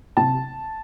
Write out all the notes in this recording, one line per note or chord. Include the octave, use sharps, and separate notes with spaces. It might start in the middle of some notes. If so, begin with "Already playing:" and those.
C3 A5